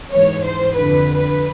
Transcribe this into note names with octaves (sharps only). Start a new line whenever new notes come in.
G#2 E3 C#5
C5
F2 D3 B4